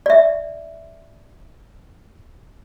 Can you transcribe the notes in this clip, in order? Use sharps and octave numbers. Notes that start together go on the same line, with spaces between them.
D5 E5